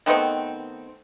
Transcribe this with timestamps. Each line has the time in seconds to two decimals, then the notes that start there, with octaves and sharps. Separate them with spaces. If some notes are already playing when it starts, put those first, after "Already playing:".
0.06 D#3 A3 B3 C4